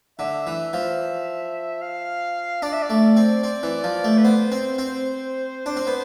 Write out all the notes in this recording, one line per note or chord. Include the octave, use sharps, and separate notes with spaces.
D3 E5
E3
F3
F5
D4 D5
E5
D5
A3
C4
C4
E3
F3
A3
B4
B3 C5
C4
C4
D4
C4
B3